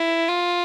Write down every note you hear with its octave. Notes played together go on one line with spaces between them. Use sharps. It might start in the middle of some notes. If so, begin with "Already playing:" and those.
Already playing: E4
F4